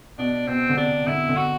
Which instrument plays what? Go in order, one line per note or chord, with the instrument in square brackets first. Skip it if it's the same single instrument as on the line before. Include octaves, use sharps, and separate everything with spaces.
[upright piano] B2 [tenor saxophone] D4
[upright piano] B2 [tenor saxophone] C4
[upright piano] D3
[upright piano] C3 [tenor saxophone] D4
[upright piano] D3 [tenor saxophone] E4
[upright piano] D3
[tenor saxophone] F#4